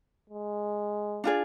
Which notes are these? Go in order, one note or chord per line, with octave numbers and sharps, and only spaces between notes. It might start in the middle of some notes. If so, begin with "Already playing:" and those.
G#3
D4 F4 G#4 D5